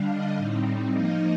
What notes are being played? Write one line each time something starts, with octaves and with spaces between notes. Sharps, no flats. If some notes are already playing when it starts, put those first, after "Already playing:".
Already playing: D3 G3 D4 F5
D#5
A2 G3 C4 D#4
F3 A#3 D#4 D#5